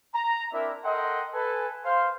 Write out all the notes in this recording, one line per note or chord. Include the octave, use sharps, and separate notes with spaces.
A#5
C4 D4 E4 A#4 D5 E5
A4 A#4 D#5 F#5 G5 C6
A4 B4 G#5
C5 F5 C6